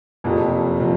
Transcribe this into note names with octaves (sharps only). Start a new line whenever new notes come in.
F#1 F2 C3 F3
C3 F3